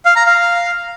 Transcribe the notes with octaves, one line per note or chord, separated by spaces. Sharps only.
F5
A#5
F5